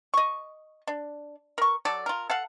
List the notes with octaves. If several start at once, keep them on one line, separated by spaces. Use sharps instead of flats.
D#5 C#6
D4
A#4 C#6
F#3 A4 D5
F4 A#4
A4 F5 F#5